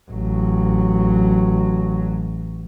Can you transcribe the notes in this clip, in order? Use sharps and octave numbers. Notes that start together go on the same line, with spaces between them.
A1 F#3